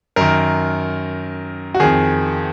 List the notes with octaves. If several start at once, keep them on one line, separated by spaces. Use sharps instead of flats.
F#2 D#3 A#4
F#4
F2 D#3 G#4